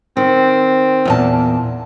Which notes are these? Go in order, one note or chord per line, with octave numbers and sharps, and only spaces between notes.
D#3 C4
E2 A#2 A5